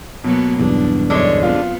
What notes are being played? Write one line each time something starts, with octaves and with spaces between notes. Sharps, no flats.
B2 F#3 A#3 B3
B1 E2 G2 D4
F#2 D3 G#3 D4 C#5
B3 C4 F4